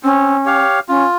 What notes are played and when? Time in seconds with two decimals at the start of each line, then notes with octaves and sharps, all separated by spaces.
0.03 C4 C#4
0.45 G4 C#5 F5
0.88 C#4 F4